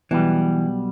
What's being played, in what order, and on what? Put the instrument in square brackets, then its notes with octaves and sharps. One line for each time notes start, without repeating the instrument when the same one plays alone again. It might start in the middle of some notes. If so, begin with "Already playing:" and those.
[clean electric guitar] B1 B2 G3 [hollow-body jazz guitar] E3